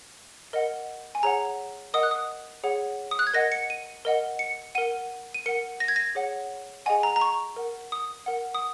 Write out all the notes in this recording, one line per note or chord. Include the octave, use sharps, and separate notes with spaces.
A#4 D#5 F#5
G#5
G#4 C#5 F#5 A#5
A#4 D#5 F#5 D#6
F#6
D#6
G#4 C#5 F#5
D#6
F#6
G#6
A#4 D#5 F#5 A#6
C#7
D#7
A#4 D#5 F#5
C#7
A#4 F#5 D#7
D#7
A#4 F#5 C#7
A#6
G#6
A#6
G#4 C#5 F#5
G#4 D#5 F#5 G#5
A#5
A#5
C#6
A#4 F#5
D#6
A#4 F#5
D#6